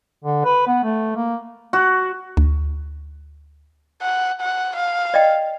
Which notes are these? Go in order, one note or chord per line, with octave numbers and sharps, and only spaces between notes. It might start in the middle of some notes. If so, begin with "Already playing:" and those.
D3
B4
B3
A3
A#3
F#4
D2
F#5
F#5
F5
D5 D#5 G5